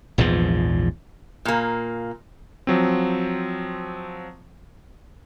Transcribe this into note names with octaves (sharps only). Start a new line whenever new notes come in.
A#1 E2 G#2 F3
A#2 A#3
F3 F#3 C4